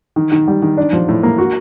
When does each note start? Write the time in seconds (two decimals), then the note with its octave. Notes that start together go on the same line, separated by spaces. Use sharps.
0.16 D#3
0.32 D#3
0.48 G3
0.62 D#3
0.77 D4
0.93 F3
1.09 A2
1.23 A#3
1.38 F#4